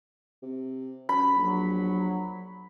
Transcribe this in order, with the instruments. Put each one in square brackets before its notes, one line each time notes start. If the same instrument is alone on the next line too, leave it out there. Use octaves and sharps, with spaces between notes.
[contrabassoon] C3
[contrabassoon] F#2 [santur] B5
[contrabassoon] A#1 [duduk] F#3